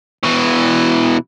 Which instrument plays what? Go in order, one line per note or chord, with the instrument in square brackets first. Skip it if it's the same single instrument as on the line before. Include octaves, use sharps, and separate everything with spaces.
[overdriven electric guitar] B2 E3